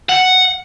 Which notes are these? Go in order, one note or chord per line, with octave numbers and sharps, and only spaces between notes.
F#5